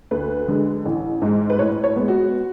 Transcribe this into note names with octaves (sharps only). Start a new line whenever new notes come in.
D2 B4
D3 G#3
A1
G#2 G#3
B4
A2 C#5
C#5
G#3 B3
F#4